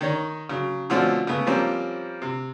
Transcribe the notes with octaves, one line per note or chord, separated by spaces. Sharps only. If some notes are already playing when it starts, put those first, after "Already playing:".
D#3 D#4 C#5
C#3 F#3
B2 D3 F3 A3 C4 C#4
C#3 A3 B3
F3 G3 A#3 C4 C#4
C3